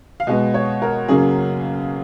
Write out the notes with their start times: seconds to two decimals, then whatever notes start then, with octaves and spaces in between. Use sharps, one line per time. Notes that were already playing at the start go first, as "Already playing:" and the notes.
0.20 F5
0.27 B2 G#3 B3 D#5
0.54 C#5
0.82 A#4
1.08 F#2 C#3 F#3 A#3 G#4